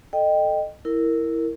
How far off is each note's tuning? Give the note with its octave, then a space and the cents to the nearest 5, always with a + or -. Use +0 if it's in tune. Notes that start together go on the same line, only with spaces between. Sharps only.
A4 +0 D#5 -20 G5 +0
E4 +0 A#4 -10